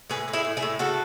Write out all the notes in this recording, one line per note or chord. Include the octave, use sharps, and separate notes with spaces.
A2 G#4 B4
A2
E4 G#4
A2
E4 G#4
A2
C#3 F#4 A4